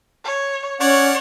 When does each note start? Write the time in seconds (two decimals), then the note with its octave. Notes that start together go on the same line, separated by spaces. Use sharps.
0.25 C#5
0.80 C#4 C#5 D5 F#5